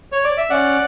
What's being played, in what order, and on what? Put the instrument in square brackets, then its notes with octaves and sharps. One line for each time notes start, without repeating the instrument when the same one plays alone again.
[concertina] C#5
D5
E5
C#4 D5 F#5